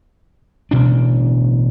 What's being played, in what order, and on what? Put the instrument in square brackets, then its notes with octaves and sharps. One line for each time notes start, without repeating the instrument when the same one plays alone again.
[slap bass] A1 B2 D3 D4